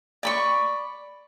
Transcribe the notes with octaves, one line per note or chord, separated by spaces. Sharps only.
D5 B5 C#6